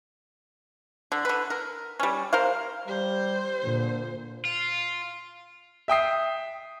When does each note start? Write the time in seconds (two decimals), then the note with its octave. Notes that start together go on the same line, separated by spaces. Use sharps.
1.12 D3
1.25 D3 B4
1.50 A#4
2.00 G3 C#4
2.33 A#4 C5 F5
2.88 G3 C5
3.63 A#2 D3
4.45 F4
5.88 E5 G5 D#6 C7